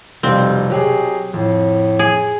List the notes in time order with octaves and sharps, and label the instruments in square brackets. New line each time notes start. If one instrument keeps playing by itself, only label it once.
[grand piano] F1 G3 F4 [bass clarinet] B2 [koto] C4
[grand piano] F#3 G4 G#4
[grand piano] F2 [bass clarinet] A2
[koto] G#4